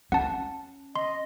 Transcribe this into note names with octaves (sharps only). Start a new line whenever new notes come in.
C#4 F#5 A5
D#5 C6